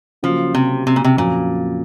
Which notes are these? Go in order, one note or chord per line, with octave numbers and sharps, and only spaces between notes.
C#3 F3 F#3 A#3
C3
C3
A#2
C3
F2 A#2 C#3 F#3 A#3